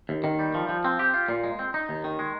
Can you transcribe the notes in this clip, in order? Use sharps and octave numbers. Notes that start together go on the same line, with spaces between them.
D#2
D#3
G3
F3
F3
C4
G4
F4
A#2
G#3
C4
D#4
D#2
D#3
G#3